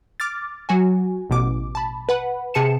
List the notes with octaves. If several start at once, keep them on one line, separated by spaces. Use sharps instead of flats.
D6 F6 A6
F#3 F#4 G#5
A1 B2 D6
A5 B5
B4 F#5 B5
C3 G#4 A5 C#7 E7